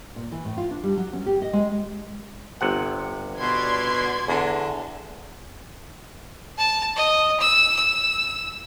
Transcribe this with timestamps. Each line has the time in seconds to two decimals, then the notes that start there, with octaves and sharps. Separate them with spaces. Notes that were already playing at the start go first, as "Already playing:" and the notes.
0.16 A#2
0.32 E3
0.45 A2
0.57 F4
0.71 D4
0.83 G3
0.97 F#3
1.13 C#4
1.26 G4
1.42 D#5
1.53 G#3
2.61 G1 C3 F#5
3.38 B2 D5 C6 G#6
4.28 E2 D3
6.58 A5
6.96 D#5
7.41 E6
7.76 E6